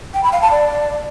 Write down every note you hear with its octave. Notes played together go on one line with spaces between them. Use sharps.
G5
B5
F5
A5
D5